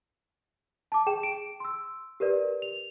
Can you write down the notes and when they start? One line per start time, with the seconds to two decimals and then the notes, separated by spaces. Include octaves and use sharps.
0.92 A5 D6
1.07 G#4 G5 E7
1.23 D7
1.60 C6 E6
2.20 G4 A#4 B4 D5
2.62 F7